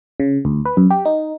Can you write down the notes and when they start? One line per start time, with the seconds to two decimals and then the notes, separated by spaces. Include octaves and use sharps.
0.20 C#3
0.45 D2
0.66 B4
0.77 F#2
0.90 G4
1.05 D#4